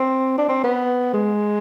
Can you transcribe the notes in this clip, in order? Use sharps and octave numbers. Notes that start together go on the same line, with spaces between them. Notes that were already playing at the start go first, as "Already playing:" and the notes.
Already playing: C4
D4
C4
B3
G#3